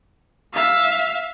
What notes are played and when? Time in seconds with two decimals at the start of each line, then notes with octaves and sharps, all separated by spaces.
0.53 E5 F5